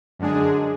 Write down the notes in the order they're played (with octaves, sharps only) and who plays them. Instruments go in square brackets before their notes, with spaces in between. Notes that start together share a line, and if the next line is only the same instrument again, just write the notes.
[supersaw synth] F#2 D3 G#3 D4 G#4